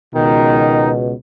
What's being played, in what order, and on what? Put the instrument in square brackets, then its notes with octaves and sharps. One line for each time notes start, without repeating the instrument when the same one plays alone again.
[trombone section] C#2 B2 [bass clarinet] D#3 [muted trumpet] D#4